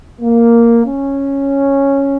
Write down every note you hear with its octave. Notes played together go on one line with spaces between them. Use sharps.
A#3
C#4